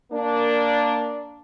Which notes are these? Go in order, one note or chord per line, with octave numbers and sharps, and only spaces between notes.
A#3 D4